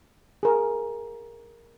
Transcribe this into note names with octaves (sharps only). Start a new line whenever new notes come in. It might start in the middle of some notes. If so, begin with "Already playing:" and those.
G#4 A#4